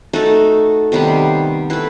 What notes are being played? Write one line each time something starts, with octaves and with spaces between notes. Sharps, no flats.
A3 D#4 F#4 A4
C3 D#3 G3 B3
A3 E4 B4